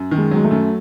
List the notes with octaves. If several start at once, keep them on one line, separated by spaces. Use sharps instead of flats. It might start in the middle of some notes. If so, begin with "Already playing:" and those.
Already playing: F#2
D#3
G#3
F#3 G#3
A3
F#2